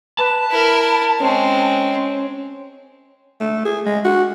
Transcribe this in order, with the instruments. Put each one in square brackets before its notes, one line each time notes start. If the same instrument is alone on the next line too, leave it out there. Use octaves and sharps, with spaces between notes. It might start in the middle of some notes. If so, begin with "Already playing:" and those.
[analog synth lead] B4 [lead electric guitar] A5
[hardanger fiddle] E4 A#4 [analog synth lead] B5
[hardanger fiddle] G#3 C4 [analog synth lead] C#4
[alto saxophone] A3
G#4
G#3
F#4